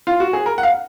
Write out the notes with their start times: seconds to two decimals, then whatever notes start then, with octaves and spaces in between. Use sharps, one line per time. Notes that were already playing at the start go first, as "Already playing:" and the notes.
0.07 F4
0.20 F#4
0.33 G#4
0.46 A#4
0.58 F#5
0.63 F5